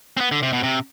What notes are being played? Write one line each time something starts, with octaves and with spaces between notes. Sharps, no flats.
C4
B3
D3
C3
B2
C3